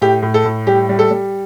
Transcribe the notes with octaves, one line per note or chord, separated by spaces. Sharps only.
A2 G4
A2
A4
A2
G3 G4
G3
A4
G3